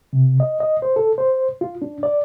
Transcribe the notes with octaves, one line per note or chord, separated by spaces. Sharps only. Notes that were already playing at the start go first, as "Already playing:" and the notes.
C3
D#5
D#5
C5
A4
C5
F4
D4
D5